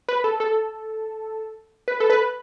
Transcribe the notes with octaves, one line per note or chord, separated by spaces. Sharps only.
B4
A4
A4
B4
A4
B4